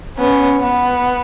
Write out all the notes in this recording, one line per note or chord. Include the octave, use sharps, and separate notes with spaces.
B3 C#4
B3